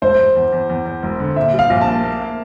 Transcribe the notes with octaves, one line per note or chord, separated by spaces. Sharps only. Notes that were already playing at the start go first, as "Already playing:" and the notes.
E1 C5
E1
E2
E2
E2
E2
E1
D3
A#2 E5
G3
F5
A#1
A5
A#3
A#3
A#3